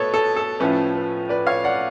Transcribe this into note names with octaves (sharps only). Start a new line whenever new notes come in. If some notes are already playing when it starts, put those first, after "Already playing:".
Already playing: B2 A3 A4 B4 C#5
A4
A4
A2 F3 A3 C#4 B4
B4
B4 D5
C#5 F5
D5 F#5